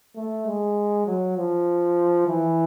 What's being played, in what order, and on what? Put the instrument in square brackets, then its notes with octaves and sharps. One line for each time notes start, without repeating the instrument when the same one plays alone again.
[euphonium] A3
G#3
F#3
F3
E3